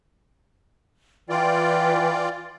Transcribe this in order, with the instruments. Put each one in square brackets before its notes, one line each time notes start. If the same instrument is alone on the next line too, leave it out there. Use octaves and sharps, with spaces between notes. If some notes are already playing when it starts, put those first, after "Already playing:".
[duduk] E3 [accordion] F4 D5 [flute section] G5